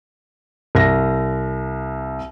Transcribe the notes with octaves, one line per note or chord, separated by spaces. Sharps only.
C2 A#6